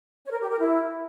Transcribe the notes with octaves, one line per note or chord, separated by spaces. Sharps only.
C#5
A#4
G4
A#4
E4